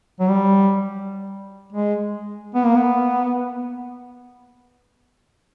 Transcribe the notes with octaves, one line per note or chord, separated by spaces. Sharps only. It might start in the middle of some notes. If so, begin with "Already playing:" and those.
F#3
G3
G#3
B3
A#3
B3